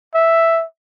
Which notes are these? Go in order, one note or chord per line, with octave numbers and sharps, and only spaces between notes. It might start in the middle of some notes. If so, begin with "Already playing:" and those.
E5